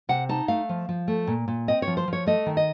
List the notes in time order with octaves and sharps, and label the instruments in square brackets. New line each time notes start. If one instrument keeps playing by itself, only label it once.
[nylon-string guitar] C3 F#5
D#4 A5
A3 F5
F3
F3
A3
A#2
A#2
C4 D#5
C#5
F3
C5
F3 C#5
A3 D#5
D#3
D#5